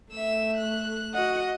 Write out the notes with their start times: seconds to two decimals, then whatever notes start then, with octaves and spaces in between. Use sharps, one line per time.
0.12 A3 E5 E6
0.57 F#6
1.14 F#4 D#5 F#5